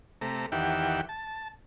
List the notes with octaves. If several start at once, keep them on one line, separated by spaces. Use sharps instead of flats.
C3 A3 A#5
E2 D#3 G4 E5 F#5 G5
A5